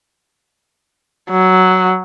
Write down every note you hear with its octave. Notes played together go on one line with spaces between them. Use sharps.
F#3